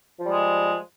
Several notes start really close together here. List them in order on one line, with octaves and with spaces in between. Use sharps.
F3 G3 G#3